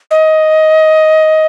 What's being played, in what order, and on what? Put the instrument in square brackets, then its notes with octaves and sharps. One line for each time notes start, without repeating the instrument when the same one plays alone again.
[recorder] D#5